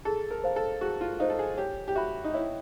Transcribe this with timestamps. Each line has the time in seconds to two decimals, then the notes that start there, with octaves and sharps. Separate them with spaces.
0.05 G#4 A4
0.31 A#4
0.44 C5 F5
0.56 A4
0.81 F#4 G#4
1.01 F4
1.19 D#4 C5 F5
1.30 A4
1.39 G#4
1.58 G4 C#5
1.88 G4
1.95 F#4 E5 G5 B5
2.24 D#4
2.34 E4 C#5